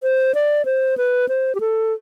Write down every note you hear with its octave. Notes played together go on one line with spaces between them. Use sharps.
C5
D5
C5
B4
C5
G4
A4